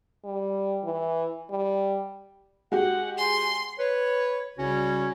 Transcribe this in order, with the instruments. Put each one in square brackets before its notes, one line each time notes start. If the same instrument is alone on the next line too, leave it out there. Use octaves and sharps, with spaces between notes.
[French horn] G3
E3
G3
[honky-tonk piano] G#3 F#4 G4 [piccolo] F#5
[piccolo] G#5 [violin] C6
[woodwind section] B4 C#5
C2 C#3 G3 C#4 F#4 C#5